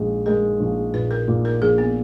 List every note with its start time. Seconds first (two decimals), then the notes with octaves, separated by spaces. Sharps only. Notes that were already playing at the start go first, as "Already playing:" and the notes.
Already playing: A#1 G#3
0.26 G#3 A#4
0.59 A#1
0.94 A#2 B4
1.11 A#4
1.28 A#2
1.45 A#4
1.61 A#1 G#4
1.78 B3